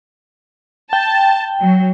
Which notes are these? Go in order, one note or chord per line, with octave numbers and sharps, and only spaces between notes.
G5 A5
F#3